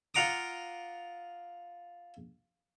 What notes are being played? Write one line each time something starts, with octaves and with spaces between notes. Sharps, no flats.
F4 F5 F#5 A#5 D6 D#6